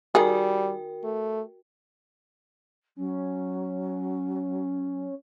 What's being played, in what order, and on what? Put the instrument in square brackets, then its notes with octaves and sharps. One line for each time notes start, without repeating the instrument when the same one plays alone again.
[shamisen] D#3 G#4 [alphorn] G3 [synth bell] F#4 A#4 G5
[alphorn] A3
[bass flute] F#3 [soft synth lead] C#4